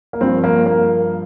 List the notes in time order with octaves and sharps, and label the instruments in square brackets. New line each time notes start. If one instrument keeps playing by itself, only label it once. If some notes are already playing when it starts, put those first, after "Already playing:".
[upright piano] A#3
G2 F3 C4
A#3
A#3